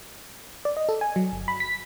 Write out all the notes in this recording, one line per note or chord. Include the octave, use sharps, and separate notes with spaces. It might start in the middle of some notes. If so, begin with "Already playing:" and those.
D5
D#5
A4
G#5
F#3
G1
B5
B6